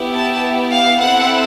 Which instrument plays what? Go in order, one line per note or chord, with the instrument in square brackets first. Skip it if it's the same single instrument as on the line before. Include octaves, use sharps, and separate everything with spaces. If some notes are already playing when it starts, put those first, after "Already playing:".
Already playing: [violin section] B3 E4 G4
A5
F5
C4 E4 A4 F#5